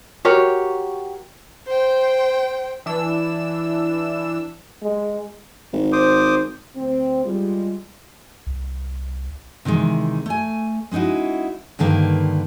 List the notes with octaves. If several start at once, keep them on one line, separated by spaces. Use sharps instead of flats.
F#4 G4 A#4 C#5
C5 G5
E3 D4 E6
G#3
G#1
C5 D6 D#6
D2 C4
G3 G#3 F4
C2
C3 D#3 E3 G#3
A3 G#5
G#3 C#4 D#4 E4 F#4
G2 D3 D#3 A#3 B4